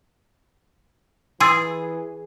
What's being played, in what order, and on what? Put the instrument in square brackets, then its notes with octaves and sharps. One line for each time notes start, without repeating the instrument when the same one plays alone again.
[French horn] E3 [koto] G#4 [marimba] C6 E6 A6